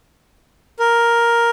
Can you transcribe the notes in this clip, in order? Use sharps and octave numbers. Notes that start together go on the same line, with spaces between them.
A#4